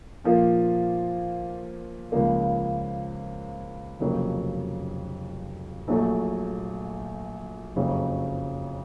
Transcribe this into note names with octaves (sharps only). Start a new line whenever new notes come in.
A#2 F3 A#3 F4
C#2 C#3 F3 A#3
F1 F2 C#3 F#3 A#3
A#1 A#2 F#3 A3
F#1 F2 C#3 F#3